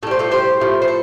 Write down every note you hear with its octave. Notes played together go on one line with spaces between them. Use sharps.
A2 G3 A4 C5
F4 A4
G4 C5
A2 F3 A3
C5
A4